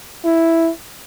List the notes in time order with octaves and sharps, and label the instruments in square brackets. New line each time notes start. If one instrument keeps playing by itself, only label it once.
[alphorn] E4